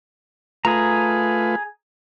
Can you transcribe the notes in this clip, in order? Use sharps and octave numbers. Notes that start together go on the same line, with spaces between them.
A3 F4 G#4 B4 A#5